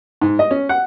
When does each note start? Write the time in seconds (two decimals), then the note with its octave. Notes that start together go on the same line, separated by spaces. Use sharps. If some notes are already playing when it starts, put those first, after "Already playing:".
0.21 G#2
0.39 D#5
0.51 C#4
0.69 F#5